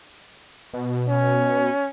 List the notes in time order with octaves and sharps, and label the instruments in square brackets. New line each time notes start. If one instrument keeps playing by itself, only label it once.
[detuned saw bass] B2
[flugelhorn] C#4